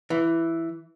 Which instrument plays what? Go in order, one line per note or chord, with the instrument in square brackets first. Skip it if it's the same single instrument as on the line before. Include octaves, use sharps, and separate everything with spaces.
[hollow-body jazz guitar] E3